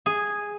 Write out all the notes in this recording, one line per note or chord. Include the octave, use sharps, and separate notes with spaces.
G#4